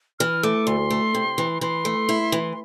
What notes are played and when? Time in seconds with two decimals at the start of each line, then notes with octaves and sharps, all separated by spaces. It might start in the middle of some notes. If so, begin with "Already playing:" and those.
0.20 E3 F6
0.43 A3 D6
0.67 D2 C6
0.90 A3
1.15 C3
1.38 E3
1.61 E3 C6
1.85 A3
2.09 E4
2.32 E3